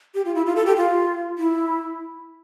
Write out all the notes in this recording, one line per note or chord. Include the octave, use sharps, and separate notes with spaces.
G4
F4
E4
F4
A4
G4
F4
E4